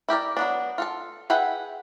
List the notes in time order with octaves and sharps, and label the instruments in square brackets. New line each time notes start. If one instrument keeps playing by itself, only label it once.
[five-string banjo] E4 G4 A#4 D5
F#3 B3 D4
F4 A4 A5
G#4 B4 E5 F#5 G5